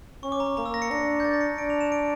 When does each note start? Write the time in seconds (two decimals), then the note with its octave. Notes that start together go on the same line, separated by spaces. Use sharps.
0.23 C#4 C#6
0.32 D6
0.40 A#5
0.57 A#3 A#5
0.65 E6
0.74 A#6
0.82 C#7
0.91 D4 A#6
1.20 G6
1.24 A6
1.33 A#6
1.41 C#7
1.50 A#6
1.58 D4 D7
1.70 F7
1.81 E7
1.92 D7